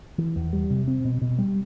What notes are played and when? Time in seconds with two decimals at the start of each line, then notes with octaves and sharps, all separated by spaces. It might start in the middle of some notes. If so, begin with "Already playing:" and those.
0.18 E3
0.36 E2
0.53 G3
0.70 C3
0.88 C4
1.05 B2
1.21 B2
1.38 G3